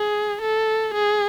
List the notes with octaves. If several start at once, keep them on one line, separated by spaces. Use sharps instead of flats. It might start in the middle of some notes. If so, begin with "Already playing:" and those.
Already playing: G#4
A4
G#4